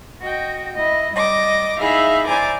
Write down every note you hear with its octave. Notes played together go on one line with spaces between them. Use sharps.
F#4 D#5 G5
E4 D#5
G3 D#5 D6 A#6
D#4 E4 G#4 E5 F5 B5
E4 C5 D5 G#5 A#5 D6